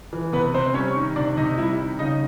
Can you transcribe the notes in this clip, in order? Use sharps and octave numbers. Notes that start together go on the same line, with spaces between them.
E3
C3 B3 B4
C3 C4 C5
G3 C#4 C#5
D#3
C3 D4 D5
C3 D#4 D#5
G3 E4 E5
D#3
C#3 D#4 D#5